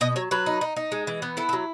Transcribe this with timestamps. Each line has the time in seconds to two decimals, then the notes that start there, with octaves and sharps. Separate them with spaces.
0.01 B2 D#5
0.16 F#3 C#5
0.31 F#3 B4
0.46 D#4
0.61 D#4
0.76 D#4
0.92 G#3
1.07 E3
1.22 B3
1.37 E4 A4
1.49 A4
1.53 F#3